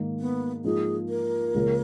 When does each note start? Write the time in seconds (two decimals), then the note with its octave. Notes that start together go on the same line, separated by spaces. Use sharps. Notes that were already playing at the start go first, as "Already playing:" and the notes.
Already playing: G#2 D#3 A#3 D#4
0.19 B3
0.64 G#2 F3 A#3 D#4 G#4
1.09 A#4
1.54 C#2 C#3 F3 A#3 C#4